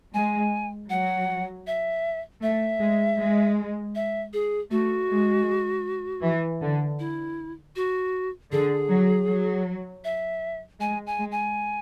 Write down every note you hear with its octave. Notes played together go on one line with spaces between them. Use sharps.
G#3 G#5
F#3 F#5
E5
A3 E5
G#3
G#3
E5
G#4
A3 F#4
G#3
E3
D3
E4
F#4
D3 G#4
F#3
F#3
E5
G#3 G#5
G#5
G#3
G#5